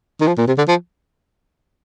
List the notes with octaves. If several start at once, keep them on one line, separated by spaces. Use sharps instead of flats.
D#3
F3
A#2
C3
D3
F3